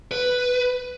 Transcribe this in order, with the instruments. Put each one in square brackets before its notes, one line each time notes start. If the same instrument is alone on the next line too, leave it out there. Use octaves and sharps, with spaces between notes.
[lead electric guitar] B4